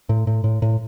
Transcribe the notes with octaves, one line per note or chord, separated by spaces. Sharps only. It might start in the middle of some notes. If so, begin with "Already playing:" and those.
A2
A2
A2
A2